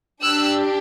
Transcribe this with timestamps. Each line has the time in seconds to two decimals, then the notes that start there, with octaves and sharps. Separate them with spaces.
0.21 D4 G4 E6 F#6